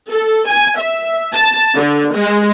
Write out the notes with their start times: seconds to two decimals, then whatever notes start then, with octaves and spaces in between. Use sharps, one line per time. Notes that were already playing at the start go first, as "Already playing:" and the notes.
0.10 A4
0.48 G#5
0.80 E5
1.33 A5
1.76 D3
2.15 G#3